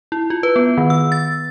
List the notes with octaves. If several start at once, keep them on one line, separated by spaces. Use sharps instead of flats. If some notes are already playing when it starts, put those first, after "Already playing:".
E4
F4
B4
B3
D#3
E6
A6